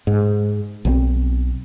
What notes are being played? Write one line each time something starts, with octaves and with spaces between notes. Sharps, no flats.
G#2
B1 F3 C4